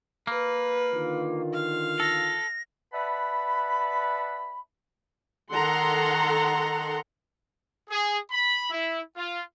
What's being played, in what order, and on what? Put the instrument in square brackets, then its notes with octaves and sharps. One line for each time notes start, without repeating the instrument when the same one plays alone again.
[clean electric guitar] A#3 [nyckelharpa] B4
[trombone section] D3 D#3 F4
[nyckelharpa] F5
[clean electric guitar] A4 [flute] A#6
[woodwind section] B4 D5 E5 F#5 A5 B5
[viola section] D#3 A4 F#5 A#5 C6
[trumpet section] G#4
B5
E4
F4